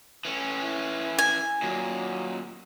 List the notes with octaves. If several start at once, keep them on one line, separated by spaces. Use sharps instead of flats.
E3 C#4
E4
G#5
D#2 A#2 F#3